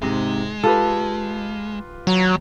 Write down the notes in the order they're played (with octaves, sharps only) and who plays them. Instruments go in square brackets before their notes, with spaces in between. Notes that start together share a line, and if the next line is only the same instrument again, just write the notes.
[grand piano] G#2 C3 [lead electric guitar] G#3
[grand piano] F4 G4 B4 [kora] A4
[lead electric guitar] D#2 A#5 [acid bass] F#3